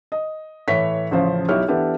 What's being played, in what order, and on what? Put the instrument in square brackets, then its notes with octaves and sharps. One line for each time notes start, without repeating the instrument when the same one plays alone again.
[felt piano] D#5
A2 E3 C#5 B6
A1 C#3 F3 C5 F5
B1 D#4 E4 G4 C#5 F6
E3 B3 D4 E4 G4 A4